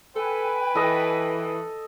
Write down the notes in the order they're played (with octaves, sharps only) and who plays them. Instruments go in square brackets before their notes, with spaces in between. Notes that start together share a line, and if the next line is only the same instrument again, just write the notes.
[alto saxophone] A4 [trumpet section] B4 [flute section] G5 G#5
[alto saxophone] E3 [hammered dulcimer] A4 D#5